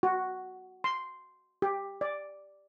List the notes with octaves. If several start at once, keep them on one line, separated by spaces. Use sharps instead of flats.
F#4
C6
G4
D5